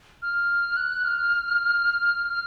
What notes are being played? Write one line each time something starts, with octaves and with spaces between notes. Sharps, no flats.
F6
F#6
F6
F6